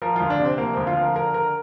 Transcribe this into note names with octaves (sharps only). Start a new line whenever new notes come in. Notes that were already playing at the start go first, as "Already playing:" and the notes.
F3 A#4
D2 F4
D4
C3
C4
F3 A#3
D2 C4
F4
F3 A#4
D3 A#4
D3 A#4